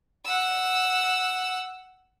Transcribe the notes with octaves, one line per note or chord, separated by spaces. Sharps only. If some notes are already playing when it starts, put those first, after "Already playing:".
F#5 E6